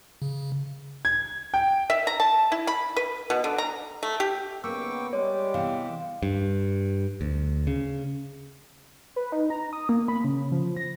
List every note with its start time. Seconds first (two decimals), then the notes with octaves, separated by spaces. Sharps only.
0.22 C#3
1.05 G#6
1.54 G5
1.90 E5
2.07 A#5
2.20 A5
2.52 E4
2.67 B5
2.96 B4
3.30 B2
3.44 D3
3.58 A#5
4.03 A3
4.20 G4
4.64 G#2 C#3 A#3 B3 G5 C#6 D6 E6
5.13 G3 G#3 C#5 D6
5.54 C3 E3 B3 F5 G5
6.23 G2
7.21 D2
7.67 C#3
9.16 B4
9.32 D#4
9.50 A#5
9.73 D#6
9.89 A#3
10.08 B5
10.24 C#3
10.52 F3
10.77 A#6